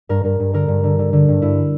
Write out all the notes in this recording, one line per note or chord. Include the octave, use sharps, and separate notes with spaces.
G2 A#4
G2 A#4
G2
D3 A#4
G2
D3
D3
D3
G2
G2 E4